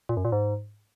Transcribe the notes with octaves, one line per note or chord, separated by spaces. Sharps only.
A#2
F#2
A#2
G#2